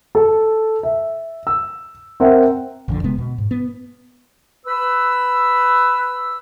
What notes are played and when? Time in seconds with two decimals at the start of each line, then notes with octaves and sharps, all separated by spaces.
0.15 A4
0.83 E5
1.47 E6
2.20 C4 A#4 E5 F#5 G5
2.88 A#1 F2 D3
3.03 E1 C3 G#3 B3
3.18 B2
3.38 G#2
3.51 B3
4.66 B4 B5 E6